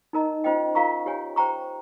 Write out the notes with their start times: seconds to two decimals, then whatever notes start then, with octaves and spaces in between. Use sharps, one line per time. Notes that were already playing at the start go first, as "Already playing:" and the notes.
0.13 D#4 A#4 D#5 A#5
0.44 C#4 F4 C5 D#5 G5
0.75 F4 A#4 F5 A#5 C#6
1.06 G4 C#5 G#5
1.36 C5 G5 A#5 C#6